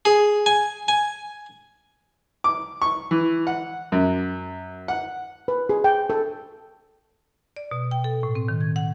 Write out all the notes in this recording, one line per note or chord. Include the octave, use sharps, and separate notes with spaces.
G#4
G#5
G#5
D6
C#6
E3
F#5
F#2
F#5
B4
G#4
G5
A4
D5
B2
G5
A4
A2
C4
D#3
G#6
F#5